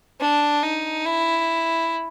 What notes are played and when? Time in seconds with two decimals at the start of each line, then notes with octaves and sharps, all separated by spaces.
0.20 D4
0.63 D#4
1.06 E4